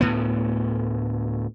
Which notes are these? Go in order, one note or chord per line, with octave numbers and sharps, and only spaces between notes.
D2 A2 B3